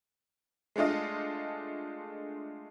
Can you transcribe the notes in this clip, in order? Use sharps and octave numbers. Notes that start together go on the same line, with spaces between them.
G#3 A3 D4 F4 D#5